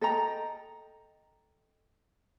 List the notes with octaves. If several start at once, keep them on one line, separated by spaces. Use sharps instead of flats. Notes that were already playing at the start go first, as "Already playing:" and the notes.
A4 D#5 G5 A#5